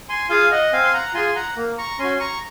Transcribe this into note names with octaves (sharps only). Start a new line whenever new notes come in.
G#5 C6
F4 G#4 F5 G#5
D#5 F#5
C4 F5 G#5
C6
F#5 A#5
F4 G#4 G#5 C6
F#5 A#5
A#3
A#5 C#6
C#4 F#4 G#5 C6
A#5 C#6